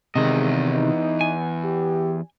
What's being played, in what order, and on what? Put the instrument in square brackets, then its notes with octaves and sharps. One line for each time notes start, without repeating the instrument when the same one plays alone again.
[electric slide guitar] E2 G#2 D#5 [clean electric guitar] C3 D#3 [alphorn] G#3
[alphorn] D#4
[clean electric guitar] G#5
[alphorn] G4